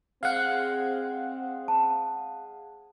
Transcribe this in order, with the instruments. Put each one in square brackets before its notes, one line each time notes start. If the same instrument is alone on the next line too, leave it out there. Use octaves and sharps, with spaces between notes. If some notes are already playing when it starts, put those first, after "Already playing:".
[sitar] G#3 [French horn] C4 [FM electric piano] F5 F#5
[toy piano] A5